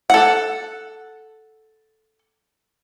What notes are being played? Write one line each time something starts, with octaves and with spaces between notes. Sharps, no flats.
A4 F#5